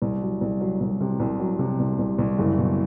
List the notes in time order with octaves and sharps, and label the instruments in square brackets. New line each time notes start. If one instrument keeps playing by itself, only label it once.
[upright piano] C2
F#3
C2
F#3
C2
C3
C2
F#3
C3
C2
C2
C2
F#1
B2